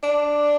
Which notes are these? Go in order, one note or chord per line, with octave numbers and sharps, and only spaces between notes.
D4